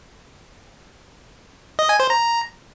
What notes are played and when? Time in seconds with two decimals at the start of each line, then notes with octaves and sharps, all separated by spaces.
1.79 D#5
1.89 G#5
2.00 C5
2.10 A#5